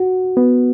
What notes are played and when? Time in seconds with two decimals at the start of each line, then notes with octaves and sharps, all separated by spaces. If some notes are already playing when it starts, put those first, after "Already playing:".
Already playing: F#4
0.37 B3